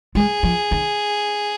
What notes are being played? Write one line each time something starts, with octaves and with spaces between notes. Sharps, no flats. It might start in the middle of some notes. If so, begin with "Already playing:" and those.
G#3 G#4
F3
D#3